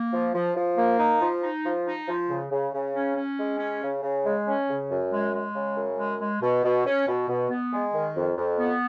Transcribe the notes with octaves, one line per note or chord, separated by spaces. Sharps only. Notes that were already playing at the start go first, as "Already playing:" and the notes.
Already playing: A#3
F3
F3
F3
A#3
D#4
F3
D#4
F3
D#4
F3
C#3
C#3
C#3
C#4
C#4
G#3
C#4
C#3
C#3
G#3
C#4
C#3
F#2
G#3
G#3
C#3
F#2
G#3
G#3
B2
B2
C#4
B2
B2
B3
G#3
D#3
F2
F2
B3